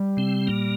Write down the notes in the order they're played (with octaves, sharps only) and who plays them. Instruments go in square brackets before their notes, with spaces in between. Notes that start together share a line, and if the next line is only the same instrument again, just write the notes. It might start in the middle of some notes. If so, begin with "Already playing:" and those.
Already playing: [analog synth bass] G3
[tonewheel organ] C3 C4
A#2 A#3